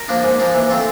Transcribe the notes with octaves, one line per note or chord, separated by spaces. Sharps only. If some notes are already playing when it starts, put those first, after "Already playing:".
Already playing: A#4
F3 A#3 D4
G#2
F3 A#3 D4
E3
A3 C4 F4